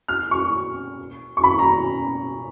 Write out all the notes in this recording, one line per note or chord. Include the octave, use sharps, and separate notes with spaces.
F6
C#6
C#6
B5
A#5